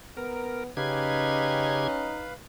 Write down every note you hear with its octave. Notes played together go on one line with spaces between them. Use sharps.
B3 A#4
C#3 C#4 D#4 G4 B4 F5 G#6